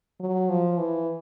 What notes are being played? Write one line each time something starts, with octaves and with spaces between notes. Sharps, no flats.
F#3
F3
E3